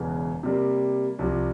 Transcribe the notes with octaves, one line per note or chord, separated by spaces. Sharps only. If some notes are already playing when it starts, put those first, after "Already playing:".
Already playing: E1 E2 C#3 E3
C3 G3 A#3
C2 C3 F3